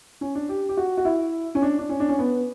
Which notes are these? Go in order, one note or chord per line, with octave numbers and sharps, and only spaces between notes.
C#4
D4
G4
G4
F#4
F#4
E4
C#4
D4
D4
C#4
D4
C#4
B3